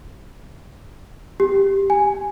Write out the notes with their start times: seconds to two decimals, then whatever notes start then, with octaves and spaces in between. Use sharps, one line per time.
1.40 G4
1.90 G#5